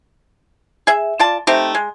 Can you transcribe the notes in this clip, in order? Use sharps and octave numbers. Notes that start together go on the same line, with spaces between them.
G#4 E5
F4 D5 A5
A3 C4 D#4 G4
G#3